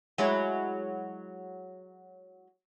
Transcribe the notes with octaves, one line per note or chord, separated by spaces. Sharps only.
F#3 G#3 E4